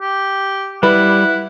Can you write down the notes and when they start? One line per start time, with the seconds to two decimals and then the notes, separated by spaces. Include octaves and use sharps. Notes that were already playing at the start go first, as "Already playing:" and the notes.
0.01 G4
0.83 G3 E4 B4 F#5